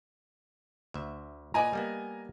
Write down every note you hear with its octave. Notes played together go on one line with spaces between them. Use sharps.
D2 E5
A#2 B4 D5 D#5 G#5 A#5
G3 A#3 B3